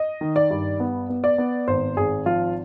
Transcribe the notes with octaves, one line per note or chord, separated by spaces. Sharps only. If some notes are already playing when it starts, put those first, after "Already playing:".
Already playing: D#5
D#3
D5
G2
B3
B3
D5
B3
G#1 C5
G#1 G#4
F3 F4